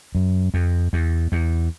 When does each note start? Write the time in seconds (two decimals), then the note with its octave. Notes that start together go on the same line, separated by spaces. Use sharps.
0.15 F#2
0.54 F2
0.93 E2
1.32 E2